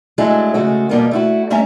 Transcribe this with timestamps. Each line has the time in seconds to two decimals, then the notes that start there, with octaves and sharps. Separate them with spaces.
0.18 F#3 G#3 A3 D4 E4 A4
0.54 C#3 G#3 A3 F#4
0.89 F2 B2 G3 A#3 B3
1.11 A3 E4 F#4
1.50 G3 A3 C#4 C#5 E5 A#5